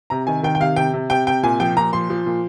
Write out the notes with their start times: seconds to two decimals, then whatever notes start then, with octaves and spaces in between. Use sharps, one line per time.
0.10 C3 A#5
0.27 D#3 G#5
0.43 D#3 G5
0.55 G5
0.60 C3 F5
0.76 C3 G5
0.94 C3
1.10 C3 G5
1.27 C3 G5
1.43 A#2 G#5
1.60 F3 G5
1.77 A#2 A#5
1.93 F3 C6
2.10 F3
2.26 A#2